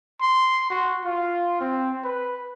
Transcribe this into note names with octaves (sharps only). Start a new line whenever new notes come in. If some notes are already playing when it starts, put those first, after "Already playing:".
C6
F#4
F4
C4
B4